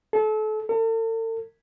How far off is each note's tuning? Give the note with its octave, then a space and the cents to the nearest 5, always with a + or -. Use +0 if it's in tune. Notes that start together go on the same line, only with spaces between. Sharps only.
A4 -30
A4 +45